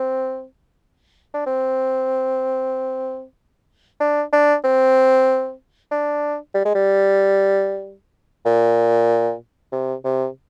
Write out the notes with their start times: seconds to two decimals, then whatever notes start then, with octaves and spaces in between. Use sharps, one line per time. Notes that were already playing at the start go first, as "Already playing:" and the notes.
Already playing: C4
1.34 D4
1.46 C4
4.00 D4
4.32 D4
4.64 C4
5.91 D4
6.54 G3
6.65 G#3
6.75 G3
8.45 A#2
9.72 C3
10.04 C3